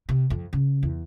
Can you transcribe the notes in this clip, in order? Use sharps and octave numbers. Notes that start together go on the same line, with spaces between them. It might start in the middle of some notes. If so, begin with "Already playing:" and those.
C3
F2
C#3
E2